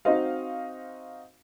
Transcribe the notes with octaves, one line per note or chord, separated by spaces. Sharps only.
C4 D#4 F#4 C5 D#5 F5